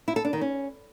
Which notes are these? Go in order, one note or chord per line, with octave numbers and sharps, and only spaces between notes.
E4
A4
D4
D#3
C#4